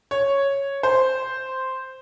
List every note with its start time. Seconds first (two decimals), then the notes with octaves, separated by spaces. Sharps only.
0.11 C#5
0.83 C5